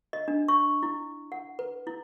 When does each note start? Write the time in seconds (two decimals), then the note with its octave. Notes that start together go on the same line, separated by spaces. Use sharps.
0.13 D#5
0.28 D4
0.48 C#6
0.83 E4
1.32 F#5
1.59 B4
1.87 E4